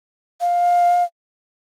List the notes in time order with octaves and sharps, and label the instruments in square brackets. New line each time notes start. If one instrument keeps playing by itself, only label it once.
[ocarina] F5